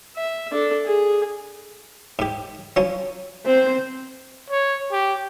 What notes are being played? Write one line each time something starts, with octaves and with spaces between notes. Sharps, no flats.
E5
D4 A4
G#4
G#2 G4
F3 F#3 C#4
C4 C5
C#5
G4